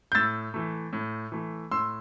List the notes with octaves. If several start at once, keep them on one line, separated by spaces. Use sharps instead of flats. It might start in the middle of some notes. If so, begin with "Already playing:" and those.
G6
A2 E6 A6
E3 A3
A2
E3 A3
A2 C6 E6